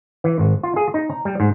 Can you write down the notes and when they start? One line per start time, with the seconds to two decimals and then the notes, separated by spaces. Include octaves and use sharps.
0.24 E3
0.39 G#1
0.63 F4
0.76 G#4
0.94 D#4
1.10 A#5
1.25 G3
1.40 G#2